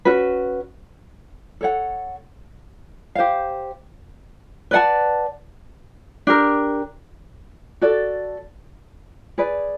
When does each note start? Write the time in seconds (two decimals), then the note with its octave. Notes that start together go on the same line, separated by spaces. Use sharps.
0.05 C#4 F#4 B4
1.61 A4 C#5 F#5
3.15 G4 C5 F5
4.71 B4 D5 F#5 A5
6.27 D4 G4 A#4
7.81 F#4 A4 D5
9.38 G#4 B4 D5